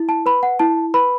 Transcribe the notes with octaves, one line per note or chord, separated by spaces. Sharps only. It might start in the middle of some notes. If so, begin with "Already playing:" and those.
Already playing: E4
A5
B4 B5
F#5
E4 A5
B4 B5